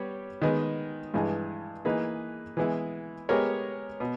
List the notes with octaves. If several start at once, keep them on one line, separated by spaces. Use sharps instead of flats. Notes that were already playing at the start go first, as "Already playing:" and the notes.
Already playing: G3 B3 G4 C#5
D#3 G#3 B3
G2 E3 G#3
E3 A#3 D#4 G#4 B4
E3 G#3 B3 E4
G#3 B3 G4 A#4 C#5
B2